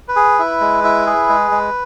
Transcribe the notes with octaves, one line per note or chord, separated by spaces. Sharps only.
B4
G#4
E4
G#3
E4
G#4
G#3
G#3